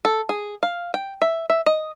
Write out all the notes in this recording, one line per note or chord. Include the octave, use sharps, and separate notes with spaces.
A4
G#4
F5
G5
E5
E5
D#5